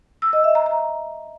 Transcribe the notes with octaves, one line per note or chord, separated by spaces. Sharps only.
E6
D#5
E5
A#5
A#5